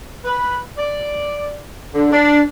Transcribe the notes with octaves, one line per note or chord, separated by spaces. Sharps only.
B4
D5
D3
D4